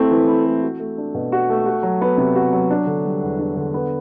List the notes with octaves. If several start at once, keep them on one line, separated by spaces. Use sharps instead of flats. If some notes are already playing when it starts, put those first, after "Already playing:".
Already playing: A3 C4 E4
E3
E4
A3
F#4
A3
D4
B2
F#4
A3
F#4
F#3
B3
C3
F#4
F#3
D4
D3
G3
E2
D4
D3
B3